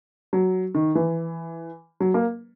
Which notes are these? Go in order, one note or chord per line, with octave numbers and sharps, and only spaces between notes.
F#3
D#3
E3
F#3
A#3